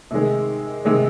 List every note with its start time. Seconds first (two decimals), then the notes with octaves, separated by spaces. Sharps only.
0.11 C3 D#3 G#3
0.85 C3 D#3 G#3